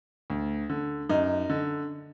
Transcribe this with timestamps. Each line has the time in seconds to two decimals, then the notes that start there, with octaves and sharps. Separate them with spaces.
0.30 D2
0.70 D3
1.09 F#2 D#4
1.50 D3